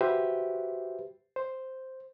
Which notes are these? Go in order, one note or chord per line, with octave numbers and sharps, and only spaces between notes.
F#4 G4 B4 C5 E5
C5